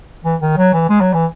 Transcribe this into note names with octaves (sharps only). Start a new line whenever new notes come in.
E3
D#3
F#3
E3
G#3
F#3
E3